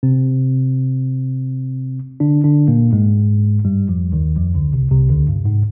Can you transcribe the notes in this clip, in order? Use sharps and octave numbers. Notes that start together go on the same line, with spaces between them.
C3 C4
D3 D4
D3 D4
A#2 A#3
G#2 G#3
G2 G3
F2 F3
D#2 D#3
F2 F3
D2 D3
C2 C3
C2 C3
D2 D3
G2
G#2